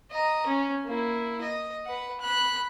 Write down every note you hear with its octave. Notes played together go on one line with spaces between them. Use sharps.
D#5 A#5
C#4
A#3 E4
D#5
B4 F#5
B5 F#6